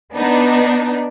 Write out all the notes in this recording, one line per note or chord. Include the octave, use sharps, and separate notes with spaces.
B3 D4 D#4